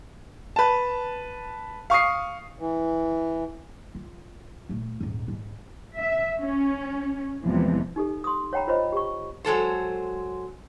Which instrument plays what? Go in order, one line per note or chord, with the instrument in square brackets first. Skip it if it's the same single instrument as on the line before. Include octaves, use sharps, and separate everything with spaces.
[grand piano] B4 A5
F5 C#6 D#6 C7
[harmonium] E3
[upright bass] F4
A#2 A3
D#1 G#2
G#2
[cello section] E5
C#4
E2 C3 E3 F3 G3 G#3
[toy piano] D#4 G4 A4
C6 D#6
C#5 F#5 G5 A#5 B5
F4 C5 C#5 D#5 B5
G4 C#6
[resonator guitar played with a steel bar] F#3 G#3 A4 C5